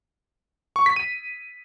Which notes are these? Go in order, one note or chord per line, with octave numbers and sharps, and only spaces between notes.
C#6
B6
D#7